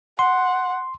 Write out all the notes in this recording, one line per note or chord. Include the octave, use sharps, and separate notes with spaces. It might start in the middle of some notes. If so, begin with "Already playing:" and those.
F#5 C6